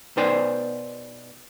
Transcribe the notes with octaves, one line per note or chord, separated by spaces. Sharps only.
B2 D#4 B4 C5 D5 G#5